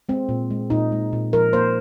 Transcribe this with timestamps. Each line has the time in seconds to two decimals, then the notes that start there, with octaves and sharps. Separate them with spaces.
0.09 G#3 C4
0.29 A#2
0.50 G#3
0.70 A#2 D#4
0.92 G#3
1.13 A#2
1.33 F3 A#4
1.53 A#3 C5